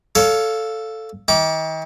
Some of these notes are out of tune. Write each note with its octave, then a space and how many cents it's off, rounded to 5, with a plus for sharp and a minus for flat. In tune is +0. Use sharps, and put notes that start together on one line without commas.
A4 +0 C#5 +20 F5 +0
D#3 +40 D6 -10